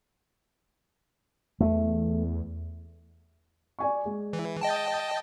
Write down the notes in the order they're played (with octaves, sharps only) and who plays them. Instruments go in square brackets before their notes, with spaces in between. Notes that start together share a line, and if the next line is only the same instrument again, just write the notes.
[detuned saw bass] E2 [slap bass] A3
[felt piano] D5 G#5 C#6
G#3
[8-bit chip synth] E3
D#5 G5 A5